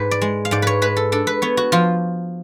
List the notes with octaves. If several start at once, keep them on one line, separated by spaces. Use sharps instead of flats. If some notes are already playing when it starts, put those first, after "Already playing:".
Already playing: G#2 B4
D5
G#3
F5
G#2 D5
B4 C#5
G#3 B4
A4
D4 A4
B4
B3 C#5
F#4
F3 F4